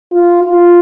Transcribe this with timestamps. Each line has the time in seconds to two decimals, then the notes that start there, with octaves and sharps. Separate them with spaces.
0.12 F4
0.43 F4